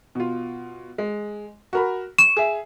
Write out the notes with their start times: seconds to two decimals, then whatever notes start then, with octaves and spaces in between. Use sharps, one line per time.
0.15 B2 F4
0.98 G#3
1.73 F#4 A#4 B5
2.18 C#6 E7
2.37 G#4 E5